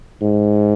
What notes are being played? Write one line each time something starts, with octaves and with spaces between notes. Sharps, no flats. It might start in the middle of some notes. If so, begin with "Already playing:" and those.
G#2